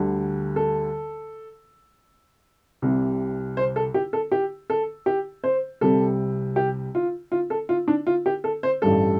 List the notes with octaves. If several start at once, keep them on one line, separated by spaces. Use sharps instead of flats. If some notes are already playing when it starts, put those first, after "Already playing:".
Already playing: D2 D3 G3
A4
C2 C3 G3
C5
A4
G4
A4
G4
A4
G4
C5
C2 C3 G3 A4
G4
F4
F4
A4
F4
D4
F4
G4
A4
C5
A1 G2 G3 A4